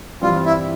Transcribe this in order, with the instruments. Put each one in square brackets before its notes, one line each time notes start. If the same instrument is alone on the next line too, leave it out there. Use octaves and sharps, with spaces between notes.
[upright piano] G2 E3 G3 C4 [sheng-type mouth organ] F4
[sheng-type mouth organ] E4